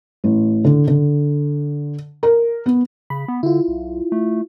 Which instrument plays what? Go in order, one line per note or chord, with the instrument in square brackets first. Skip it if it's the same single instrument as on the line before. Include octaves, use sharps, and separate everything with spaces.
[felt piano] A1
D3
D3
A#4
B3
[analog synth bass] C#3 [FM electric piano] B5
[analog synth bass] B3
[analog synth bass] D3 [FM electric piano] E4 F4
[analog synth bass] B1
A3